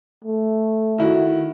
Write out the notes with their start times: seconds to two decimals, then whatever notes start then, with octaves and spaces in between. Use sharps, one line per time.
0.24 A3
0.98 D#3 E4 F#4